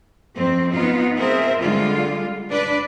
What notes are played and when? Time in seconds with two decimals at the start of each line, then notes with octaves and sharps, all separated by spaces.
0.35 F2 C4
0.73 B3 D#4 F4
1.16 C4 G#4 A#4 C5 E5
1.59 D3 G3 G#3 F4
2.49 D4 B4 D5